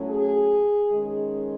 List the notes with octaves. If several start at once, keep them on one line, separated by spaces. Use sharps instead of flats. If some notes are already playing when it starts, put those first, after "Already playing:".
Already playing: A2 F#3 A3 C#4
G#4
D#3 G#3 C#4